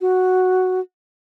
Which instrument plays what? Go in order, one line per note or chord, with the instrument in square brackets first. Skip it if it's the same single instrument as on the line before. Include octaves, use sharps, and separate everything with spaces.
[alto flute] F#4